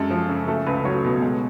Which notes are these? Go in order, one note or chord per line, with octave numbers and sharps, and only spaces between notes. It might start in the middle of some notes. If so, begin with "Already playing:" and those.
Already playing: F#2 G#3 A4
F3
C#3
A3 A4
C#2 B4
B4
F#3 C#5
B2
G#3